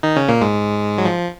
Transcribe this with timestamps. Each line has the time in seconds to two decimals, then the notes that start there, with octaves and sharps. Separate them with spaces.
0.03 D#3 D#4
0.16 C#3 C#4
0.29 A#2 A#3
0.41 G#2 G#3
0.98 F#3
1.05 F3